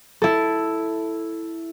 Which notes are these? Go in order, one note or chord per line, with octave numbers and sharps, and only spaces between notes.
E4 A4